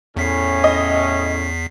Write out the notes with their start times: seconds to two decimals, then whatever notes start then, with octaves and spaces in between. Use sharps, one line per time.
0.17 E2 A2 C#4 B6 C7
0.64 D#5